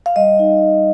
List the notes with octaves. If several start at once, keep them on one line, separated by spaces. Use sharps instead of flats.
F5
G3 D#5
D#4
G3